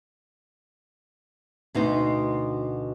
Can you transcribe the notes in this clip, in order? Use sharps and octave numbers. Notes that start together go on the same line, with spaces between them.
D2 B2 D#4 C5